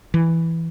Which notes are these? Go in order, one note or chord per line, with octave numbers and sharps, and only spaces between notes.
E3